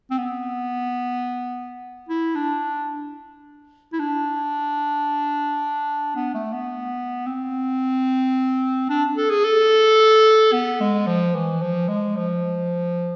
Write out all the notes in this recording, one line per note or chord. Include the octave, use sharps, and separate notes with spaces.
C4
B3
E4
D4
E4
D4
B3
A3
B3
C4
D4
A4
G#4
A4
B3
G#3
F3
E3
F3
G#3
F3